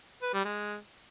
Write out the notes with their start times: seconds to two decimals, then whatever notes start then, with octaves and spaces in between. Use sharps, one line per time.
0.22 B4
0.34 G3
0.45 G#3